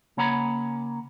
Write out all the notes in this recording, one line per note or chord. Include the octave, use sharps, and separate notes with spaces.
C#3 A#3 C#5 F#5 A#5 B5